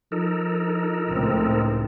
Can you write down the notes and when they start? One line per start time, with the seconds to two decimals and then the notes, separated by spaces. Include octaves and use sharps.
0.12 F3 D#4 A4 A#4
1.09 C#2 A2 C4